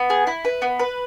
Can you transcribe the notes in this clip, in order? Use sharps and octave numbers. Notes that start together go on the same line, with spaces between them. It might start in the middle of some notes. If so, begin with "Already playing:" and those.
Already playing: B3
G#4
E4
B4
B3
B4